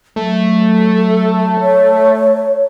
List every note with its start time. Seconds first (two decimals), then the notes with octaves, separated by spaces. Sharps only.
0.16 F#3 A3
1.60 C#5